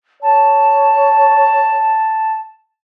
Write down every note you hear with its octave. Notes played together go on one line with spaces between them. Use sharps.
C#5 A5